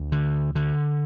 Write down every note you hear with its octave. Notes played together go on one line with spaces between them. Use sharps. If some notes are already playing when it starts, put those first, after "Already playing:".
Already playing: D2
D3
D3